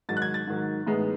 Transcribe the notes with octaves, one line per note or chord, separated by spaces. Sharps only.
G#2 D#3 F#3 A6
F#6
G#6
A6
G#2 D#3 F#3
A2 E3 G#3 B3 D#4